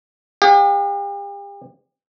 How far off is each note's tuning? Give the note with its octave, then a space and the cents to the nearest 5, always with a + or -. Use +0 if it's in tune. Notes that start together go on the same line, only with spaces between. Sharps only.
G4 +40 F#5 -45